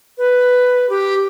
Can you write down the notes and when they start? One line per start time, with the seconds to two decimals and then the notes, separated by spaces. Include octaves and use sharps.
0.18 B4
0.90 G4